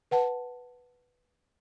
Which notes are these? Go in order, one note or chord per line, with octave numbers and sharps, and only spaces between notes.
B4 F#5 A5